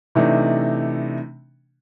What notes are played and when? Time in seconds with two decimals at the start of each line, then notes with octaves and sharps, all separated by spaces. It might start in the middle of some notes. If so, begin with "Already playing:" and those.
0.15 C3 E3 A3 D4 D#4